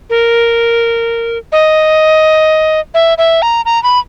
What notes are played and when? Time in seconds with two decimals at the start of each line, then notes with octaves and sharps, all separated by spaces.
0.10 A#4
1.52 D#5
2.94 E5
3.18 E5
3.42 A#5
3.65 A#5
3.83 B5